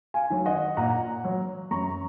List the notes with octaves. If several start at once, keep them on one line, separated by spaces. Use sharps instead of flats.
F5 G#5
D#3 F#3
D#5 F#5
A#2 F#5 A#5
F#3
F#2 A#5 C#6